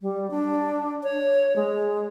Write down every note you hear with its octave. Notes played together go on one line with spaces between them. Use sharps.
G3
D4
C#5
G#3